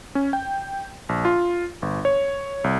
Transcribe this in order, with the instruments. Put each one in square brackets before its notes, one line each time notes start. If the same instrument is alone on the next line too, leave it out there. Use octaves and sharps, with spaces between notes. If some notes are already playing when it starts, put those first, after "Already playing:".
[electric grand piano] C#4
G5
A#1
F4
G1
C#5
C2